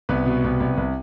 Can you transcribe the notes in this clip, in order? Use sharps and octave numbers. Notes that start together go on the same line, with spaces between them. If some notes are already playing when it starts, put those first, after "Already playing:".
C2 B3 B4
B2
C2
C2
C2